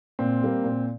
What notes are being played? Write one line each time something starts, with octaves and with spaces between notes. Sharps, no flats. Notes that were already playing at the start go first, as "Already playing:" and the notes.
A#2 C4
G3 A#3
A#2